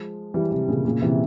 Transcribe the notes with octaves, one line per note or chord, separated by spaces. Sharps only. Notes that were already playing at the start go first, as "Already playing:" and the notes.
Already playing: F3 G#3
E3 G3
C3 E3
A#2 C#3
A#2 C#3
C3 E3